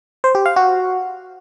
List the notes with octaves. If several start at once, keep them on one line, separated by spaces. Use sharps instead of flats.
C5
G4
F5
F#4